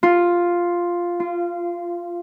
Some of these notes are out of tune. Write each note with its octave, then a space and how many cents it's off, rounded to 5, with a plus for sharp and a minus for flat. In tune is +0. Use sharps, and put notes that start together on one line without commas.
F4 +0
F4 -20